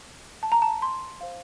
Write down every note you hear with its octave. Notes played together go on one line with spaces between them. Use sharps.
A5
A#5
A5
C6
C5 F5